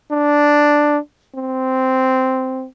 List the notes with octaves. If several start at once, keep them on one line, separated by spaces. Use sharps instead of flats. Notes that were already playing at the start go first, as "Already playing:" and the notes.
D4
C4